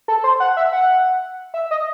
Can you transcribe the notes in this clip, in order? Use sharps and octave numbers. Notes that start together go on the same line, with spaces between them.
A4
C5
F#5
E5
F#5
E5
D#5